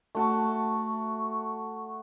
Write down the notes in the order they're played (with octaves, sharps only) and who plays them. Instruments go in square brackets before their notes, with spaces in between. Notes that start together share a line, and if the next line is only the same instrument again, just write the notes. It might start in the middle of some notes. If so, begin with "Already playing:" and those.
[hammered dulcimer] A3 F#4 A5